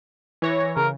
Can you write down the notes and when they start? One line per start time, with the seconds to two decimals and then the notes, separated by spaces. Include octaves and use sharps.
0.42 E3 C#5 A#6
0.77 C#3 A#4